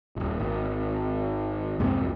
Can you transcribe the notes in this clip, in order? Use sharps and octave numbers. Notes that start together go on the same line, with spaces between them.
D#1 G#1
G#1
C2 F2 G#2 C3